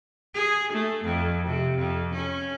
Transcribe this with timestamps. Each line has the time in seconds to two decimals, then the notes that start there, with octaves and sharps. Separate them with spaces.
0.34 G#4
0.73 A3
1.04 F2
1.47 C3
1.78 F2
2.14 C#4